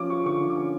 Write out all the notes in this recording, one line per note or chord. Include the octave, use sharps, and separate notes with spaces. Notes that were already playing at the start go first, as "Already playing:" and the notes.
Already playing: F3 C#4 D6
F4 C#6
D3 C#6
F3
D6
C#4